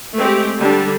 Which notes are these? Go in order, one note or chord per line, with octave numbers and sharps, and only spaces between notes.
G#3 A3 C4 G4
D3 G3 D4